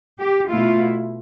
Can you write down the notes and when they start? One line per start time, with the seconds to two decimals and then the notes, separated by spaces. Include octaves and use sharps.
0.19 G4
0.50 B2 A3 E4 F4